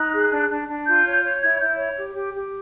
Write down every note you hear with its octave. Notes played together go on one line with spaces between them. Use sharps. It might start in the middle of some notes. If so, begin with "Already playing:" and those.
Already playing: D#4 F#6
G#4
D4
D4
D4
F4 G6
C#5
G6
C#5
E4 G#6
E4 G6
C#5
G4
G4
G4